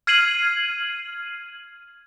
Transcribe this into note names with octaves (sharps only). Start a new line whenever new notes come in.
F6 G#6 C7 D#7 F#7